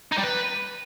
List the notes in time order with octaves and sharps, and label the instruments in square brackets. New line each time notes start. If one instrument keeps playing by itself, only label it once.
[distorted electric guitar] D#4
G3
B4